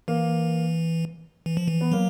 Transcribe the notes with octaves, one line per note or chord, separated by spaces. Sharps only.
E3 A#3
E3
F3
E3
B3
F#3 A#3